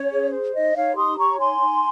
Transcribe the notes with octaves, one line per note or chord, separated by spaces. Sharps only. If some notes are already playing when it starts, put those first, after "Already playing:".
Already playing: C#4 C#5
G#4
C5
D#4 D#5
D#4 C#5 F5
G4 C6 D#6
C#5 A#5 C#6
D#4 G#5 C6
D#4